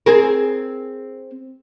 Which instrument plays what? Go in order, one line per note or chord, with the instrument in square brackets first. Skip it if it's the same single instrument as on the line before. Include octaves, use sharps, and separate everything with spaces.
[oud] C4 G#4 A#4